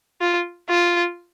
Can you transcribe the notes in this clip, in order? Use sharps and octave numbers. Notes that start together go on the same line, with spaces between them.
F4
F4